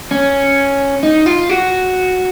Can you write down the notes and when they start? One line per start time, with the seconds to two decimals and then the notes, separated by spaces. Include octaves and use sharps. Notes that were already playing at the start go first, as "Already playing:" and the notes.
0.11 C#4
1.03 D#4
1.26 F4
1.50 F#4